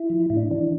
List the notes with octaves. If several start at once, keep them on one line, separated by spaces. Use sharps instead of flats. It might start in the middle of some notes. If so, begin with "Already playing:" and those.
Already playing: E4
F3
A2 E4
D4
E3 D4